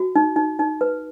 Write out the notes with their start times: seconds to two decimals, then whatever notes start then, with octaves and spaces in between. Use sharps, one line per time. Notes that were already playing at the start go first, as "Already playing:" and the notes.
Already playing: F#4
0.16 D#4
0.36 D#4
0.59 D#4
0.81 B4